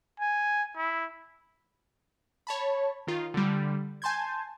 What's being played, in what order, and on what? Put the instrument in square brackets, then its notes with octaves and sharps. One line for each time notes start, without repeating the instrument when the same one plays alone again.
[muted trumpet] G#5
E4
[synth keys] C#5 A5 B5
D#3 F4
D3 G3
G#5 A5 C6 G6 G#6